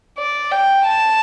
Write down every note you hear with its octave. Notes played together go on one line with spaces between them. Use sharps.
D5
G5
A5